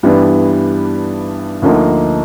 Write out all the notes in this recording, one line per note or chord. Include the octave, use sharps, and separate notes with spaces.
G2 E3 G3 B3 D4
D2 D3 F3 A#3 D#4